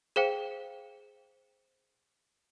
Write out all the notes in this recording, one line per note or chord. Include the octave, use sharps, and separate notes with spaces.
G#4 C5 F5 G5